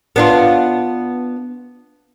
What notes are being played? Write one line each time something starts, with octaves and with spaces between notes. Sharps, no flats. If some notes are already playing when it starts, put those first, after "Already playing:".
B3 D4 F4